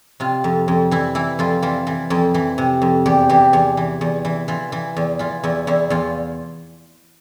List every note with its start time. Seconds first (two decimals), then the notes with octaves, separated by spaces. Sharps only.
0.20 C3 F4
0.44 F2
0.68 F2
0.91 E3 E4
1.15 E3 E4
1.39 F2 F4
1.62 E3 F4
1.87 E3
2.10 F2
2.34 E3
2.58 C3
2.82 F2
3.06 E2 G4
3.29 E3 G4
3.53 E2
3.77 E3
4.01 E2
4.25 E3
4.48 E3 F4
4.72 E3
4.97 E2
5.19 E3 F4
5.44 E2 E4
5.67 E2 E4
5.90 E2 F4